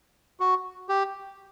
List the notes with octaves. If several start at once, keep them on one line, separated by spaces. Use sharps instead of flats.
F#4
G4